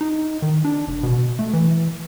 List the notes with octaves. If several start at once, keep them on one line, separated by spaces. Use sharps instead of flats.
D#4
D#3
D4
F1
B2
A3
E3